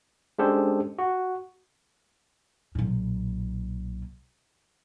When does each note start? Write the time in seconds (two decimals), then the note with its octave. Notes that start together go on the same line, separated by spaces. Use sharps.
0.39 G#3 C#4 D4 G4 A4 C5
0.99 F#4
2.75 B1 A#2